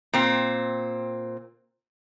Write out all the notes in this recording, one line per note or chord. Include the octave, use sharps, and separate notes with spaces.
A#2 C4